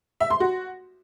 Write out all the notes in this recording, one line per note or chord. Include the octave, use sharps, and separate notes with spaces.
E5
C6
F#4